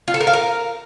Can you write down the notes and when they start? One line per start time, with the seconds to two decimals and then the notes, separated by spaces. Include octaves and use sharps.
0.08 F4
0.14 A4
0.21 A#4
0.27 F5
0.33 A#4